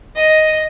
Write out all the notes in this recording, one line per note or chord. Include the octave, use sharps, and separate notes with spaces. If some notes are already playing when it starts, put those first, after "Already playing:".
D#5